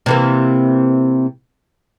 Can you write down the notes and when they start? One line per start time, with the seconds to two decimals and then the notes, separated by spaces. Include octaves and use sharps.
0.06 C3 E3 A#3